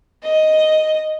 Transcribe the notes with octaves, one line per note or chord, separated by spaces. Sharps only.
D#5